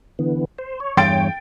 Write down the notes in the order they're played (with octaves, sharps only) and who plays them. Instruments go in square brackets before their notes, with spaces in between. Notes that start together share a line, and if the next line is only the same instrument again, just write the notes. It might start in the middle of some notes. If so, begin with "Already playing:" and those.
[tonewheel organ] D3 E3 B3
C5
C#5
[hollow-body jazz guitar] E2 G2 C6 [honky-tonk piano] G5 A6 D7